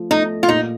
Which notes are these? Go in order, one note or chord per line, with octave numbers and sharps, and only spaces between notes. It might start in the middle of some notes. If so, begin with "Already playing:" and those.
Already playing: F3 A3
A3 D#4
F4
A#2 D#4